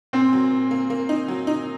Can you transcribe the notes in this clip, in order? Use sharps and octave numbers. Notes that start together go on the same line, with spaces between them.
A#2 C4
F#3
A#2
A#3
A#3
D#4
F#3
D#4